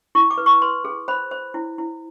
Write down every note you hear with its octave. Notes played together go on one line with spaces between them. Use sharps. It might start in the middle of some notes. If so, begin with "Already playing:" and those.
E4 C#6
D6
B4
C#6
B4 C6
G#4
C5 B5
C5
E4
E4